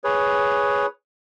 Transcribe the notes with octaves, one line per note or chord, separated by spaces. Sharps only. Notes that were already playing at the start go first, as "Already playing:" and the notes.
G#4 B4 C#5